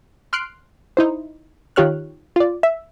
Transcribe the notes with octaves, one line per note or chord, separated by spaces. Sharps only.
C6 F6 F#6 C7 D7
D#4 E4 C5
D#3 F4 G4 C#5 F6 F#6
F4 D5
E5